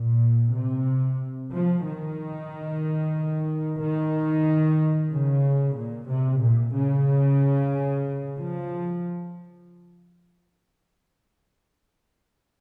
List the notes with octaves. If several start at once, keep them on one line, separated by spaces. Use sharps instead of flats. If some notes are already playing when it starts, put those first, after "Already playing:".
Already playing: A#2
C3
F3
D#3
D#3
C#3
A#2
C3
A#2
C#3
F3